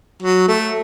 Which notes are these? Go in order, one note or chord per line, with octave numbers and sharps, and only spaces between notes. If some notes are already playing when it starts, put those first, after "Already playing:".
F#3
A3